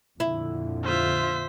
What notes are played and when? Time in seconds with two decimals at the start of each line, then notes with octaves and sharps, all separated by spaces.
0.20 F2 A#2 D3 E4
0.84 F4 C5 E5 B6